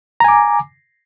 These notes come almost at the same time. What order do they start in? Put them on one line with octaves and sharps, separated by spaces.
A#5 G#5 D6